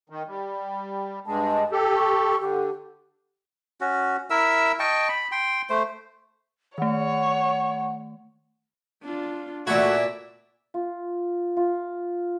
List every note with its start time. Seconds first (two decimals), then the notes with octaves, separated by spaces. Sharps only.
0.09 D#3
0.27 G3
1.26 G2 G#3 A5
1.72 G4 A4
1.96 C#6
2.40 D3 G4
3.81 C#4 F#4
4.30 E4 A#4 E5 E6
4.79 D#5 G5 A5 C#6
5.08 B5
5.32 G5 C6
5.70 A3 C5
6.78 D#3 A3 C#5 F#5
9.03 D4 F4
9.67 A#2 A3 E4 F#4 D5 E5
10.74 F4
11.57 F4